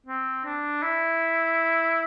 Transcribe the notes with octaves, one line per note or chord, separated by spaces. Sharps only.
C4
D4
E4